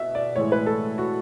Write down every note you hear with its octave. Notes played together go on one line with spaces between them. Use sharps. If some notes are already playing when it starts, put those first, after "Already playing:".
Already playing: B2 E5
D5
A2 E3 G#3 C#5
B4
A4
F#4